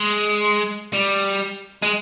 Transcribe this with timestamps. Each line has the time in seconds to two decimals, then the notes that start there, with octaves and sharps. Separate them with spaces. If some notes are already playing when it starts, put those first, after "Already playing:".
Already playing: G#3
0.93 G3
1.82 G#3